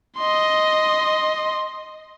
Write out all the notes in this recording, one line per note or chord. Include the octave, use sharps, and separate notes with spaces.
D#5 C6